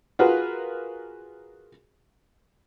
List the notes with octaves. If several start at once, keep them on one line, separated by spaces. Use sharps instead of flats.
F4 F#4 G#4 A#4 B4